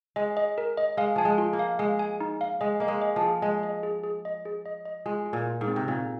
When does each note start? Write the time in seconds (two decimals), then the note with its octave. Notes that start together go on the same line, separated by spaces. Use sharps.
0.16 G#3 D#5
0.37 D#5
0.58 A#4
0.77 D#5
0.97 G#3 F5
1.16 F3 G#5
1.25 G#3
1.38 F4
1.53 A#3
1.59 F5
1.79 G#3 F5
1.99 G#5
2.21 D#4
2.41 F5
2.61 G#3 D#5
2.80 A#3 D#5
2.88 G#3
3.02 D#5
3.16 F3
3.23 G#4
3.42 G#3 D#5
3.63 D#5
3.83 G#4
4.04 G#4
4.25 D#5
4.45 G#4
4.66 D#5
4.85 D#5
5.06 G#3 F4
5.26 F4
5.33 A#2
5.47 F4
5.61 G#2
5.68 C4
5.76 C3
5.88 A#2 C4